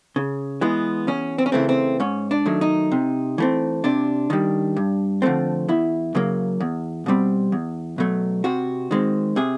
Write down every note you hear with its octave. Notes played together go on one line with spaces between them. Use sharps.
C#3
E3 G#3 B3
E2 C#4
C4
C#4
C#3 E3 A3 C4
C4
G#2 C#4
D4
D#3 F#3 A3
D#4
C3
E3 A3 C4
C3 D4
D#3 G3
G2
D3 F3 A3 C4
E2 E4
C#3 F#3 A#3
E2
B2 G3 C4
E2
B2 F#3 A3
C3 F#4
D#3 G#3 C4
C3 G#4